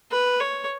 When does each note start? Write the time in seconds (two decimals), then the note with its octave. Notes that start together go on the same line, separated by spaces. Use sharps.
0.11 B4
0.40 C#5